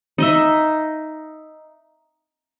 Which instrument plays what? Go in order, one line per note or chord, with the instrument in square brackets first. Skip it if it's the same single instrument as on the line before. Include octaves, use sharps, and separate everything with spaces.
[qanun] D#4 D#5 E5